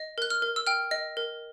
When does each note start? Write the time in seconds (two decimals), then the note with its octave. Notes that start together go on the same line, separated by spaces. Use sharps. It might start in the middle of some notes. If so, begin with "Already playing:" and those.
Already playing: D#5
0.18 A#4 F#6
0.30 F6
0.42 A#4
0.56 E6
0.67 G5 F6
0.91 D#5
1.17 A#4